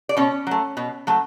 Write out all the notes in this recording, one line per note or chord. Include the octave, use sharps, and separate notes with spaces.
D5
B2 C#4 C#5
F#3 A3
B2
F#3 A3